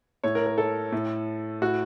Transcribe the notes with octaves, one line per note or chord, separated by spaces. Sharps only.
A2 C#5
A#4
A#4
A4
A2
A2 F#4